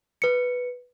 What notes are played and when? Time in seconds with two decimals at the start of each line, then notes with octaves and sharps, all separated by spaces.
0.22 B4 C#7